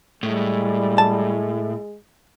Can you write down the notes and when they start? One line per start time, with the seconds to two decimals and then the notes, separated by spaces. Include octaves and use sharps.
0.23 A2 G3 G#3
0.98 A5